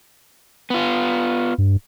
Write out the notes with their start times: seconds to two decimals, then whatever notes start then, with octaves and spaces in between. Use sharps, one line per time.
0.70 B3 F4
1.58 G2